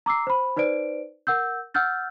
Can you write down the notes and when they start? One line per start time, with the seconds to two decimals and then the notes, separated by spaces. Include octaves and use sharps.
0.06 A#5 D6 E6 C7
0.27 C5 B5
0.56 D#4 B4 C5 D5 D7
1.27 A#4 F#5 E6 G6
1.74 F#5 E6 F6 G6 A6